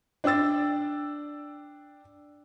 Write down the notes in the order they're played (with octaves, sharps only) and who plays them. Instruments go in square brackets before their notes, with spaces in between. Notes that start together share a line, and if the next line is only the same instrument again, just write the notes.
[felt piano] D4 D5 G5 E6 A6